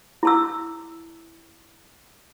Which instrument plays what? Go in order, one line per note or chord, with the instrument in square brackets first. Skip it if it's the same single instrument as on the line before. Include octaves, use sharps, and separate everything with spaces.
[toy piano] E4 A5 E6